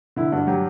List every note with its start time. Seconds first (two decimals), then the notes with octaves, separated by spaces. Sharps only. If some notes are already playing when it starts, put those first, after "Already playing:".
0.16 D3 E4
0.32 G2 F#4
0.47 F#3 G4